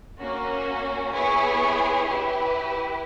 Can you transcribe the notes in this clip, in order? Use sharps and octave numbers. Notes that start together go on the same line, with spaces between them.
A#3 C#4 F#4
B3 E4 G#4 C#5
E4 G4 B4